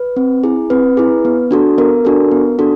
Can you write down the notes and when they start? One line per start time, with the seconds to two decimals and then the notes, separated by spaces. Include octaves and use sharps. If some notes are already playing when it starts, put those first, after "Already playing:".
Already playing: B4
0.17 C4
0.44 E4 G#4
0.70 C4 B4
0.97 E4 G#4
1.25 B3
1.51 D4 F#4 A4
1.78 B3 A#4
2.05 D4 F#4 A4
2.32 B3
2.59 D4 F#4 A4